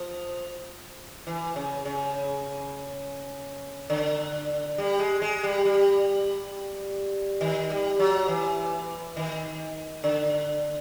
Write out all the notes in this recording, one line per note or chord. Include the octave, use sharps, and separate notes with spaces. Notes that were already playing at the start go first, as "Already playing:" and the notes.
Already playing: F3
E3
C#3
C#3
D3
G3
G#3
G#3
G3
G3
D#3
G3
F#3
E3
D#3
D3